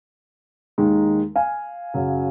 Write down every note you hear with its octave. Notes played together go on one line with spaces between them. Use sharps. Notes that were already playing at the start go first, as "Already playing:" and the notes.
D#2 D#3 G#3
F5 G#5
F#2 C#3 F#3